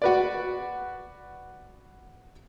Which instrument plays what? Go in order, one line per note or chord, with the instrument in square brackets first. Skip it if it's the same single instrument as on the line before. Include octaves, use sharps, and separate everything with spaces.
[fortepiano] F#4 B4 D5